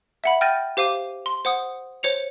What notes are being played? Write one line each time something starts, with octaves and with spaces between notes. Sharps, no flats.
E5 F#5 B5
G5 F6 G6 A6 A#6 D#7
G4 C5 F5 D6 D#7
C6
C5 F#5 D#6
C5 C#5 C#7 F7